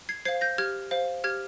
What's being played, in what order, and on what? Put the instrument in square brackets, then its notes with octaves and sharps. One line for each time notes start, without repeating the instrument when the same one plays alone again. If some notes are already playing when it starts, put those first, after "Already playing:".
[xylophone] G#6 C7
C5 F5 G#6 C7
G6 A#6
G4 F6 G#6
C5 F5
G4 F6 G#6